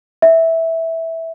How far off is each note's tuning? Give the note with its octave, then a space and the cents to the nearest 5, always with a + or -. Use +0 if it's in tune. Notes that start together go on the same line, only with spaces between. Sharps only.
E5 -10